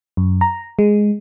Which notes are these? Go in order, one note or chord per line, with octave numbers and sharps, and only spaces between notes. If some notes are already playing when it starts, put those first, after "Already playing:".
F#2
A#5
G#3